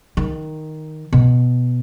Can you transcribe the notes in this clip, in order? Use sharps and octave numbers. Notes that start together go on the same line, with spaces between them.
D#3
B2